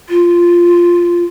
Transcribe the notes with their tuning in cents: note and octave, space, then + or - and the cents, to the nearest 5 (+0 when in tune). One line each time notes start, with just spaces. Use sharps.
F4 -5